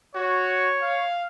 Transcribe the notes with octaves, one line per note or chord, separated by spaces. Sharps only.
F#4 C#5
F5